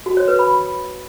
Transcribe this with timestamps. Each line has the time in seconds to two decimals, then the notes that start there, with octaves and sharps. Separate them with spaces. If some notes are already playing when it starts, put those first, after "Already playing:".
0.06 F#4
0.17 C#5
0.28 B4
0.39 B5